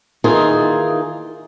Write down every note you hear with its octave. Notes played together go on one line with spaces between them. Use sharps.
D#3 E3 A#3 D#4 F4 G#4